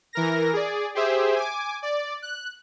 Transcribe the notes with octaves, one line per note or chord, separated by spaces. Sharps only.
E3 A#4 A#6
G#4 D5
G4 G#4 C5 E5
G#5 D6
D5
F#6